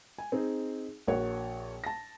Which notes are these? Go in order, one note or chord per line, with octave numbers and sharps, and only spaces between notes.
G#5
C4 D#4 G#4
A#1 F#4 A#4 C#5 F#5
A5 A#6